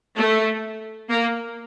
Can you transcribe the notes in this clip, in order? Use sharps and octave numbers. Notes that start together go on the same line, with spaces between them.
A3
A#3